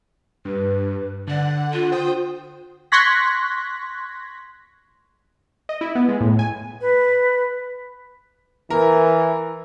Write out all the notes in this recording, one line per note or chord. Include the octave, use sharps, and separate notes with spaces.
G2 B4
D3 D5 F#5
F4
C5 G5 D#6
C6 C#6 F#6 G#6 A#6 B6
D#5
E4
B3
G#3
A2
G#5
B4
E3 A#4